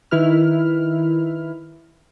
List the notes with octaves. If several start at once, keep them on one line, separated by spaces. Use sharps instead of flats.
D#3 E4 B4 F6